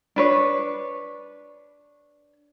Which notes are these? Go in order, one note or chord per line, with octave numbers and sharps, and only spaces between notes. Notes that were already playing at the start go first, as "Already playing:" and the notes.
D4 B4 C#5